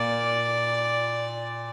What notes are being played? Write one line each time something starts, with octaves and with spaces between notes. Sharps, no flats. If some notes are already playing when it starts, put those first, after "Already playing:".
Already playing: A#2 D5